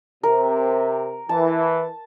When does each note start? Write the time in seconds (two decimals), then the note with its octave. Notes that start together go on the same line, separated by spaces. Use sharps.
0.23 C3 A#4
1.29 E3 A5